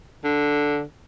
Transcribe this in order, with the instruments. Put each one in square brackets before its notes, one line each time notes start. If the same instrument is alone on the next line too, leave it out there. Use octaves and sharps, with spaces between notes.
[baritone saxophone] D3